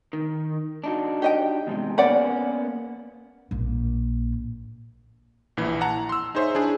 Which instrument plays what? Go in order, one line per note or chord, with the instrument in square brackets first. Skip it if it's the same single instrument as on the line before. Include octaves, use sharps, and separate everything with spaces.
[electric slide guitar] D#3
D4 D#4 F#4
[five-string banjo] G4 D#5 G5
[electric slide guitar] E2 G#2 C3
[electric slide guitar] A#3 B3 C#4 [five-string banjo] D5 F#5 B5
[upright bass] A#1 A#2
[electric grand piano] A#1 E3 E4
F#5 A5 A#5
C6 E6
D#4 G#4 C5 C#5 E5
D4 E4 G#4